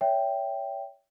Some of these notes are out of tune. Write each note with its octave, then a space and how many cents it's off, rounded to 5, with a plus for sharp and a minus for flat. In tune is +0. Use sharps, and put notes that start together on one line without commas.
C#5 +25 E5 +0 G5 +0